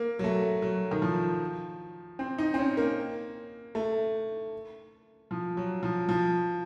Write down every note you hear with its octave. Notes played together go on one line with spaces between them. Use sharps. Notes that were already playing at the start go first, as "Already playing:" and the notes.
Already playing: A#3
F#3
A3
F#3
D#3
F3
C4
D#4
C4
C#4
A#3
A3
F3
F#3
F3
F3